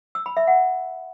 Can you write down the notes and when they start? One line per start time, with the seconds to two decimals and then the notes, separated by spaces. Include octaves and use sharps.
0.15 E6
0.26 B5
0.37 E5
0.47 F#5